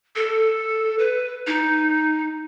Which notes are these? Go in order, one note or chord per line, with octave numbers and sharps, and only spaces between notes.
A4
B4
D#4